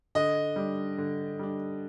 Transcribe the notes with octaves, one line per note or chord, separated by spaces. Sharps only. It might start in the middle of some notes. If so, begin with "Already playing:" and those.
D3 D#5
G3 D4
D3
G3 D4